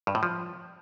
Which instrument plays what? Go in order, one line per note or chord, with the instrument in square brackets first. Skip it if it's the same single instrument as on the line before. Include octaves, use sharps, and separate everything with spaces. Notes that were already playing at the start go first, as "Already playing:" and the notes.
[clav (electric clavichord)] G2
A2
F3